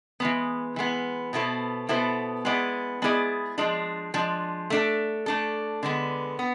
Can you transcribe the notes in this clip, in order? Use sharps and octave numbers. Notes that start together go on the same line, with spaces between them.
E3 G#3 B3
E3 G#3 B3
B2 B3 E4 A4 C5
B2 B3 E4 A4 C5
G#3 B3 E4 G#4 D5
G#3 B3 E4 G#4 D5
F3 G#3 D4
F3 G#3 D4
A3 D4 A4
A3 D4 A4
D3 G#3 B3
B3